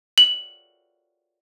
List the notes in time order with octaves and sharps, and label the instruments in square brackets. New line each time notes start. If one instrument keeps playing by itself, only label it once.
[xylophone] F#7